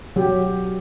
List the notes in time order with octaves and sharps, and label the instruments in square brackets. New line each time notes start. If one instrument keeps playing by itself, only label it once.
[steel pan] F#3 G4